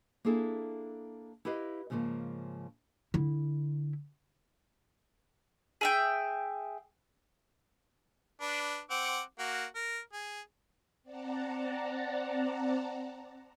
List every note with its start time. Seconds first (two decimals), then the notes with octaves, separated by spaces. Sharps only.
0.25 A#3 D4 E4 G#4 A4
1.45 E4 G4 B4 D#5 F5
1.90 G#2 C#3 F3 G#3 A#3
3.14 D3 E4
5.81 G#4 E5 G5
8.41 D4 B4
8.90 C4 F#5 D6
9.39 A#3 F#4
9.75 A#4
10.13 G#4
11.03 C4 D5 F#5 A5 A#5